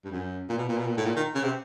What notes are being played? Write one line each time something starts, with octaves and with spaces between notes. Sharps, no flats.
G2
F#2
A#2
B2
A#2
B2
A#2
A2
A#2
D#3
C#3
C3